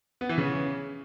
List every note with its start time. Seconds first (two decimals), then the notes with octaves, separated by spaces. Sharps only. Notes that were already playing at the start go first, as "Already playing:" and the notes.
0.21 B3
0.29 E3
0.38 C#3